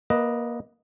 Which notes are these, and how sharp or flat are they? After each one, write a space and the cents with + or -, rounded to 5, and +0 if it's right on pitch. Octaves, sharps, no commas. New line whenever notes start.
A#3 +20 B4 +0 D#5 +0